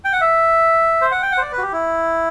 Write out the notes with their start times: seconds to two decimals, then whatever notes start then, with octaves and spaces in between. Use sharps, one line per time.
0.05 G5
0.13 F#5
0.21 E5
1.02 C5
1.11 F#5
1.22 G5
1.32 F#5
1.37 C5
1.42 D5
1.52 B4
1.58 F#4
1.62 G4
1.72 E4